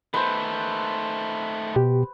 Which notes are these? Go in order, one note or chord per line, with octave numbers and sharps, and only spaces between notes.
D#3 A3 B4 C5
B2 G4